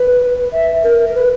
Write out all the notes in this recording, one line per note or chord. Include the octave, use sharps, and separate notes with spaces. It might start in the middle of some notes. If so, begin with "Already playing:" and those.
Already playing: B4
E5
A#4
B4